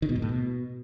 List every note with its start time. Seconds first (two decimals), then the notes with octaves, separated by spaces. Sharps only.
0.02 D#3
0.09 B2
0.16 G#2
0.22 A2
0.29 B2